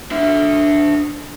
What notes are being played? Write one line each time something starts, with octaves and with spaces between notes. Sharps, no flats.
D4 E5